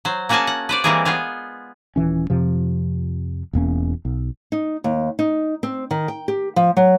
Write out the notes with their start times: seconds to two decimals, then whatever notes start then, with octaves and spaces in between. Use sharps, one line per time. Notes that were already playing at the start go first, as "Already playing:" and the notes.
0.05 F#3 C5
0.29 A#3 C#4 F#4 G#4 G#5 A5
0.47 F#5
0.69 B4 C5 D5
0.84 E3 G3 G#3 A#3 C4 G#4
1.05 B3 F4 G#4 F5
1.96 D#1 E3 C#4
2.30 F2 C3 F3
3.53 E1 E2 A#3 C#4
4.05 B1
4.52 D#4
4.84 D#2
5.19 D#4
5.63 C4
5.91 D#3
6.08 G5
6.28 G4
6.56 F3
6.77 F#3